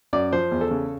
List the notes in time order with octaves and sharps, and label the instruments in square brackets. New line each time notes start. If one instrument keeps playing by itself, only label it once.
[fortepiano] F#2 D5
F3 C5
E2
A4
C#3